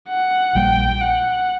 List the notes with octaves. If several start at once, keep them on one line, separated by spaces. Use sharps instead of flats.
F#5
A#1 A#2 G3 A#3 G5
F#5